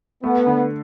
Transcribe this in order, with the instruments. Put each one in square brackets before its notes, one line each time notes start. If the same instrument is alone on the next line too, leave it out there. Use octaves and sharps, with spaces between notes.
[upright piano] A3 [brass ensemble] B3
[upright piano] D3